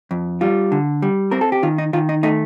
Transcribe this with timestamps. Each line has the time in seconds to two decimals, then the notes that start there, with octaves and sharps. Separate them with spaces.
0.11 F2
0.41 G3 F4
0.72 D3
1.02 G3
1.31 C4 A#4
1.41 A4
1.52 G4
1.63 D#3 F4
1.78 D#4
1.93 D#3 F4
2.09 D#4
2.23 A3 D#4